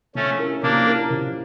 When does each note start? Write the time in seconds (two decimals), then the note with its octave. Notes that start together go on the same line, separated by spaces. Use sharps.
0.15 F3 A3 C#4
0.39 C#4 E4 G4 A#4
0.63 F3 A#3 D4
0.87 C#4 E4 G4 A#4
1.11 F3